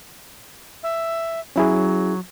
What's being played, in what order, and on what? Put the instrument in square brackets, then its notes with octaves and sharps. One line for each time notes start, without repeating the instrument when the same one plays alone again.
[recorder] E5
[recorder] F#3 [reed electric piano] C#4 E4 G#4